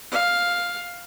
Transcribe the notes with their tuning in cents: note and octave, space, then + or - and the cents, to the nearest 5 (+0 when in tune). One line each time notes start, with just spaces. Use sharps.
F5 +5